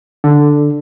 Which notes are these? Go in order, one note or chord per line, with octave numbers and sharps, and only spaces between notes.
D3